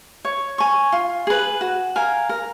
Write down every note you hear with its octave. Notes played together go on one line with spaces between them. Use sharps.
C#5
G#5 C#6
F4
G#4 B4
F#4
A#4 F5 G#5
A#4